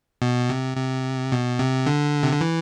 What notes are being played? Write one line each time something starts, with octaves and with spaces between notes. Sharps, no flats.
B2
C3
C3
B2
C3
D3
C3
D3
E3